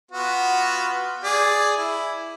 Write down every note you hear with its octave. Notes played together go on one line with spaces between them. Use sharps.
B3 F4 F#4
G#4 D5
E4